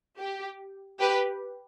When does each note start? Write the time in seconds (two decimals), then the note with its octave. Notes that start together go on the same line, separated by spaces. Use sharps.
0.18 G4
1.00 G4 B4